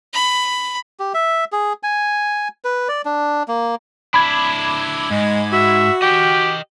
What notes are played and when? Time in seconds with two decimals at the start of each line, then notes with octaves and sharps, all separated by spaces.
0.13 B5
1.00 G4
1.14 E5
1.52 G#4
1.83 G#5
2.64 B4
2.88 D5
3.05 D4
3.48 A#3
4.14 D4 E4 B5 D6 G#6
5.11 G#2 G#3
5.53 F#4 E5
6.02 G4 D#5 G5